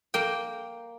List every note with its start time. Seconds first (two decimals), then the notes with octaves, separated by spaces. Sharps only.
0.14 A#3 G5